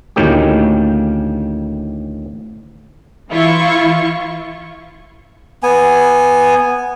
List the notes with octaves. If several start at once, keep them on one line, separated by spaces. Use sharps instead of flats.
D2 A2 D#3 A#3 C#4 G4
E3 E4 F4 C#6
B3 G#5